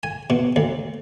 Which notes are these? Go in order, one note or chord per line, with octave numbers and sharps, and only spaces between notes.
G#5
B2
D2